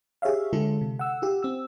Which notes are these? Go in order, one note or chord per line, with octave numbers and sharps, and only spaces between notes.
G4 G#4 C#5 E5 F5
D3 G#3 F4 A4
C3
F#5 E6
F4 G4 E6
C4 E6